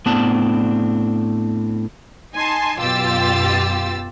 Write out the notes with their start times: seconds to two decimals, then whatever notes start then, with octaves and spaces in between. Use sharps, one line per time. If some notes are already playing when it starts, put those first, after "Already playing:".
0.06 A2 B3 C4 D4 D5 A5
2.34 D#4 G#5 A5 C6
2.78 F#2 B2 F4 G4 E6 A6